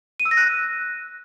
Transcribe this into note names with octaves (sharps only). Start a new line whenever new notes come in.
D#7
E6
A#6
F#6